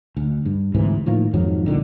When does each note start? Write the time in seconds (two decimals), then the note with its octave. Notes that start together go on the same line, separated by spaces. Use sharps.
0.17 D2
0.45 G2
0.74 D2 G#2 C3 E3
1.06 A2 D#3 F3 A#3
1.34 F2 G#2 D#3 F#3
1.66 C2 A#2 D3 D#3